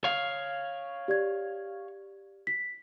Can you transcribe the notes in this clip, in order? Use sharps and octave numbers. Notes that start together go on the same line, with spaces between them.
C#5 F5
G4 D5 G#6
B6